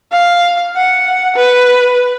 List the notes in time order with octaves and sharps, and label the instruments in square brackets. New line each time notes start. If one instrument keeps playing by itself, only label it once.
[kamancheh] F5
F#5
B4